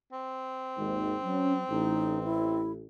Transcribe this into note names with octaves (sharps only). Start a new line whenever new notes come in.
C4
G#1 D#2 G#2
F#3 C#4
A1 D#4
E4